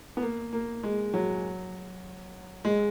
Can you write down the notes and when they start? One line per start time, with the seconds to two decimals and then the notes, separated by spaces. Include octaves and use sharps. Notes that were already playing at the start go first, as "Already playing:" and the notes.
0.17 B3
0.22 A#3
0.53 A#3
0.83 G#3
1.14 F#3
2.65 G#3